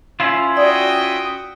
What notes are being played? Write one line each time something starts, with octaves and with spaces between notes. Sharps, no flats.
C#4 E4 F4
F#4 D5 G5 D#6